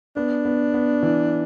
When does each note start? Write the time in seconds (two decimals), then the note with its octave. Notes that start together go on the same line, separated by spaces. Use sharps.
0.16 B3 D4
0.45 B3
0.74 B3
1.03 E3